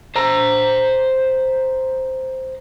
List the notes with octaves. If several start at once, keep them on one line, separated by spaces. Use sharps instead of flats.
C5 A#5